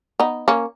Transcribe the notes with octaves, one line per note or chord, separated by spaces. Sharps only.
B3 D#4
A#3 C#4